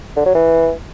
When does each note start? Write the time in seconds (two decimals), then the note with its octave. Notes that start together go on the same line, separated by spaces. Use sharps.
0.16 D3
0.26 F#3
0.35 E3